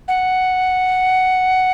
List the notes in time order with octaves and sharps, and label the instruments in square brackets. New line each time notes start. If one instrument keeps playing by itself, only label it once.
[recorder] F#5